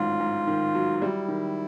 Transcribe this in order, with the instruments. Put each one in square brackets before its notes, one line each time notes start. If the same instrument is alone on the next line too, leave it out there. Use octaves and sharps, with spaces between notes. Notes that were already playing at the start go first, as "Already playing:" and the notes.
Already playing: [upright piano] A1 G#2 D#3 F#3 [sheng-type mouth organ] F4
[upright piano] G#2
D#3
F#3
[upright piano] G3 [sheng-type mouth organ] E4
[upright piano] D#3